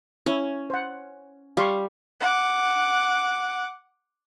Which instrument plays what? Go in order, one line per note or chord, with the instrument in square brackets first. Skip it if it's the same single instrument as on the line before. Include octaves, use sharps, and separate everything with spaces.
[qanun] C#4 [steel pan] E4
[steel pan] C5 F#5
[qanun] G3 [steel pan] F5 C6 C#6
[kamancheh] F#5 D6